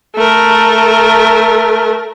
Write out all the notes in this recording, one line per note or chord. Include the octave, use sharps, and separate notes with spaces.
A3 A#4